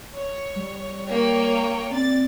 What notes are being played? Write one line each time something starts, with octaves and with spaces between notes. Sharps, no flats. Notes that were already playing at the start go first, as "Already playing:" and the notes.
C#5
G3
A#3 C#5 G5
C4 D5 A6